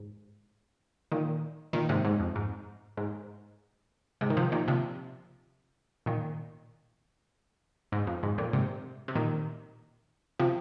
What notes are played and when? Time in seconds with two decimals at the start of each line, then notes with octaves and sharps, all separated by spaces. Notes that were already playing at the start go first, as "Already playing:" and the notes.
Already playing: G#2
1.12 A#2 D#3
1.73 A#2 D#3
1.89 G#2 C3
2.05 G#2
2.20 F2
2.36 G#2
2.97 G#2
4.21 G#2 C3
4.30 D#3
4.37 C3 F3
4.52 A#2 D#3
4.68 C3 F3
6.06 A#2 D#3
7.92 G#2
8.07 F2
8.23 G#2
8.38 F2 A#2
8.53 G#2 C3
9.08 C3
9.15 A#2 D#3
10.39 C3 F3